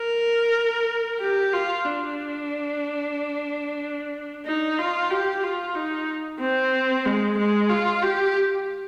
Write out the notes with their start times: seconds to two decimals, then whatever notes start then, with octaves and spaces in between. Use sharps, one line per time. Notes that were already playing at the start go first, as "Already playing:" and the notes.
Already playing: A#4
1.21 G4
1.54 F4
1.86 D4
4.46 D#4
4.79 F4
5.11 G4
5.43 F4
5.75 D#4
6.40 C4
7.06 G#3
7.38 G#3
7.70 F4
8.03 G4